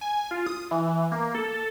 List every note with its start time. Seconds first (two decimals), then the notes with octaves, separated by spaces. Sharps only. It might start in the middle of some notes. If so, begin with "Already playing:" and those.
0.01 G#5
0.31 F4
0.46 D#6
0.71 E3
1.12 A#3
1.35 A4